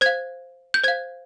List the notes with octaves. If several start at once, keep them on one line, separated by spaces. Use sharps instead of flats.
C5 F5 G#6
G6
C5 F5 G#6